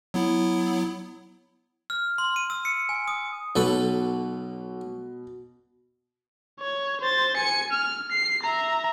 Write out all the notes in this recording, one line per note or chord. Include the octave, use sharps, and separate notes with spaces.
F#3 B3 E4
F6
C6
D#7
E6
C#7
G#5
D#6
B1 B2 A4 B4
C#5
C5 A6
G#5 C#7
F6
C7
E5 A#5